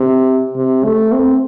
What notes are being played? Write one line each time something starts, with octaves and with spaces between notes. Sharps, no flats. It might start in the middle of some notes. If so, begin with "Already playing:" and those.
Already playing: C3
C3
A3
C4